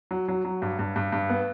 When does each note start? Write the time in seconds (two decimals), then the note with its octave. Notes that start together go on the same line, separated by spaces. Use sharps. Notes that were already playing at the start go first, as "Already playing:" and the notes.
0.11 F#3
0.28 F#3
0.45 F#3
0.62 G2
0.79 G2
0.96 G2
1.12 G2
1.30 B3